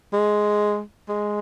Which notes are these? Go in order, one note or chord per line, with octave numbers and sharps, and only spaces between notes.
G#3
G#3